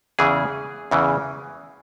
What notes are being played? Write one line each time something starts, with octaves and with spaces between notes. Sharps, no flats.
E2 C#3 E3 G#4
E2 C#3 E3